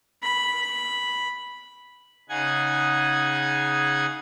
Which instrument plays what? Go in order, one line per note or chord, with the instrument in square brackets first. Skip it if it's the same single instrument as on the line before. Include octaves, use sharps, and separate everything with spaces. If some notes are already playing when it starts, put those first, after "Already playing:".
[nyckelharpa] B5
[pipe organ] C#3 D#4 G#4 F#5 G#5 G#6